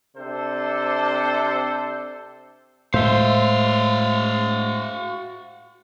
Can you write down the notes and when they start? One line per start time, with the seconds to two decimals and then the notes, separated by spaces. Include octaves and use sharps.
0.16 C3 D4 A4 C5
2.94 A2 G#3 F#4 C5 E5 F5 C6